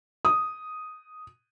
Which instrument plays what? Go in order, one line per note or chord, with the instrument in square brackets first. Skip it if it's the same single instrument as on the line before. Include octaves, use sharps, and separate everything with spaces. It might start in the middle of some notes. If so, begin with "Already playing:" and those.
[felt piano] D#6